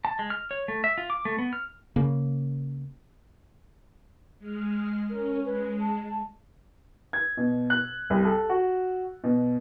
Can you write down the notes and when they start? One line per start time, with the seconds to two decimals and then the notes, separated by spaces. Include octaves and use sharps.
0.05 A5
0.19 G#3
0.30 F6
0.51 C#5
0.68 A3
0.84 E5
0.98 F4
1.10 D6
1.25 A3
1.38 B3
1.53 F6
1.96 C#3 A#3
4.38 G#3 F6
5.10 C#4 A#4
5.45 G#3 B4
5.81 A5
7.13 G#6
7.37 B2
7.70 F#6
8.10 C2
8.25 A4
8.49 F#4
9.24 B2